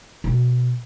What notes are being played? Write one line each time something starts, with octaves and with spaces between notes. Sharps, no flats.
B2